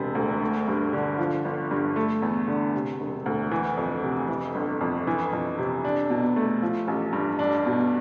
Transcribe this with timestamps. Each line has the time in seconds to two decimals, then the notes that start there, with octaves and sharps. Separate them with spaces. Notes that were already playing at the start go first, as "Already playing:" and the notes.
Already playing: E1 C3
0.15 D2
0.41 A3
0.68 G2
0.93 D3
1.18 F3
1.45 G1
1.71 G2
1.96 A3
2.22 E2
2.48 D3
2.74 C3
3.00 E1
3.26 D2
3.51 E3
3.77 F2
4.03 C3
4.28 E3
4.55 G1
4.81 F2
5.07 E3
5.33 F2
5.58 C3
5.85 D4
6.10 B2
6.36 A3
6.62 F3
6.88 A1
7.13 G2
7.39 D4
7.66 B2